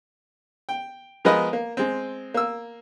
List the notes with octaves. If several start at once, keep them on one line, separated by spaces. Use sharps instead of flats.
G5
F3 G#3 B3 A#4 B4 D#5
A#3
G#3 C4
A#3 E6